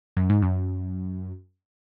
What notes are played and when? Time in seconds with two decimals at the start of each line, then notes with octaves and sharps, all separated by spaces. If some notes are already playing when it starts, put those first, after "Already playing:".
0.17 F#2
0.30 G#2
0.42 F#2